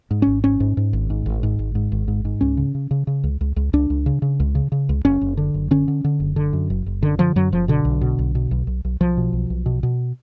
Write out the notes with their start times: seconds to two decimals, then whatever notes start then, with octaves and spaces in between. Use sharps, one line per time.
0.11 G#2
0.22 G#1 C#4
0.44 G#2 C#4
0.60 G#2
0.77 G#2
0.93 G#1
1.10 G#2
1.26 G#1
1.43 G#2
1.59 G#1
1.75 G#2
1.92 G#1
2.08 G#2
2.25 G#2
2.41 C#2 C#4
2.57 C#3
2.75 C#3
2.91 C#3
3.07 C#3
3.24 C#2
3.41 C#2
3.56 C#2
3.73 C#2 D4
3.90 C#2
4.06 C#3
4.22 C#3
4.40 C#2
4.55 C#3
4.72 C#3
4.89 C#2
5.05 F#1 C#4
5.21 F#1
5.37 D3
5.54 F#1
5.71 D3 C#4
5.88 D3
6.04 D3
6.20 F#1
6.36 D3
6.53 F#2
6.70 F#1
6.86 F#1
7.02 F#2 D3
7.19 D3 F3
7.36 F#2 F#3
7.52 F#1 F3
7.68 B2 D3
7.85 B1
8.01 B2
8.19 B1
8.35 B2
8.51 B1
8.67 B1
8.85 B1
9.00 B1 F3
9.17 B2
9.33 B1
9.50 B1
9.66 B2
9.83 B2